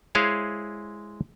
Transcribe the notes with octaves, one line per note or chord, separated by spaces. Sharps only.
G#3 E4 G#4 C5 C#5 F5